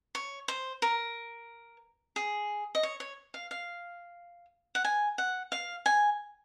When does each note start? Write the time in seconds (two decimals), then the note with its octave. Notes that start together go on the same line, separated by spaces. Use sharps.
0.15 C#5
0.48 C5
0.82 A#4
2.16 G#4
2.75 D#5
2.83 C#5
3.00 C#5
3.34 F5
3.51 F5
4.75 F#5
4.84 G#5
5.18 F#5
5.52 F5
5.86 G#5